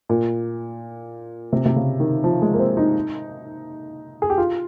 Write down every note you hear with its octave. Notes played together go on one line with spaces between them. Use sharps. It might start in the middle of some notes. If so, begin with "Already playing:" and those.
A#2
C3
C3
C#3
D#3
F3
G#3
A#3
C4
D#4
G#4
G4
F4